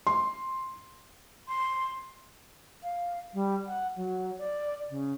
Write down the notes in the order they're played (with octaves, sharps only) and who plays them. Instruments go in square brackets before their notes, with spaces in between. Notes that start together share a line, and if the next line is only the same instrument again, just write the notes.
[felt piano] C6
[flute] C6
[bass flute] F5
G3
F#5
F#3
D5
C#3